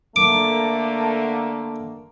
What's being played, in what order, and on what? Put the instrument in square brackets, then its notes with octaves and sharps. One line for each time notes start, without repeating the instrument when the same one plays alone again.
[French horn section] D3 A3 A#3 [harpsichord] D6